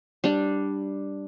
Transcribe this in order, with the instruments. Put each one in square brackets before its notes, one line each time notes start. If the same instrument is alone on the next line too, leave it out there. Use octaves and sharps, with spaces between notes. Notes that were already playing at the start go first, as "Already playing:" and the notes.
[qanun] G3 D4